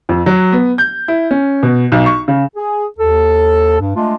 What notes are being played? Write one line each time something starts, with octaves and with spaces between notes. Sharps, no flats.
F2
F#3
B3
G6
E4
C#4
B2
B1
C#6
C#3
G#4
D#2 A4
G2
G#3 A3 D4 F4